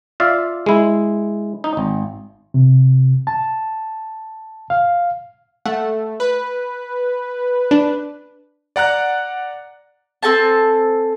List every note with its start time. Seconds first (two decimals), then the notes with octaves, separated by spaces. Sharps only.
0.20 F4 D5 E5 F5
0.66 G#3 E4
1.64 D#4
1.77 G#1
2.54 C3
3.27 A5
4.70 F5
5.66 A3 F#5
6.20 B4
7.71 D4
8.76 D5 F#5 A#5 F#6
10.23 C4 A4 G#5 A5